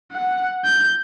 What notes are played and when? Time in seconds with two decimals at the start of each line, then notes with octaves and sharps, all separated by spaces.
0.12 F#5
0.65 G6